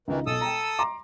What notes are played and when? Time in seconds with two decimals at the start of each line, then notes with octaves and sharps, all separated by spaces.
0.08 C#2 D#3 E3 D#4
0.27 B1 A4 D#6 E6
0.41 G5 A#5
0.79 A#5 C6 D6